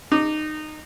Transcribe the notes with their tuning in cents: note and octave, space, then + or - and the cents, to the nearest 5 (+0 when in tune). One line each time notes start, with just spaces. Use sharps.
D#4 -20 D6 +0